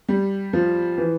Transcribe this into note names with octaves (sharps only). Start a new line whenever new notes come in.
G3
F3
E3